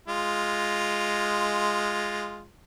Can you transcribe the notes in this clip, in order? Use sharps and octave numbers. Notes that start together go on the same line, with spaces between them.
G#3 F4